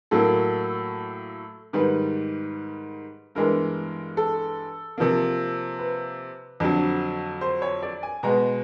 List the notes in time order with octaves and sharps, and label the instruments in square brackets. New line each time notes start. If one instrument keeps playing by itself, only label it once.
[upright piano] A2 F#3 A#3 A4
G#2 D#3 G3 B4
G2 E3 G#3 B3 A#4
A4
C3 F3 A#3
B4
F2 D3 F#3
C5
C#5
D5
G#5
B2 G#3 B3 A#5